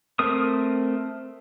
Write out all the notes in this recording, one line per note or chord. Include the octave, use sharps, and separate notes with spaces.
A3 C4 A#4 D#6